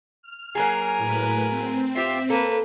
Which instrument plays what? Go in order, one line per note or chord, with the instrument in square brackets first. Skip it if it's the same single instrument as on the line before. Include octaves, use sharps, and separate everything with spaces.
[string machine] F6
[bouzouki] F#3 A#3 G#4 [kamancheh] A#4 G#5
[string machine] A2 B4
C4
[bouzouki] F4 G4 [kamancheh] E5
[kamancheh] A#3 B4 [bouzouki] A4